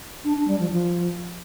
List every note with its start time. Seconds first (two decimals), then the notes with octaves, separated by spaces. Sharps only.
0.24 D4
0.36 D4
0.48 G3
0.59 F3
0.71 F3